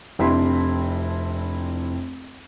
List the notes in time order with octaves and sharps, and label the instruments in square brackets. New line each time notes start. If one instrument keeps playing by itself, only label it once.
[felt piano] F1 C4 D4 E4 B5 C6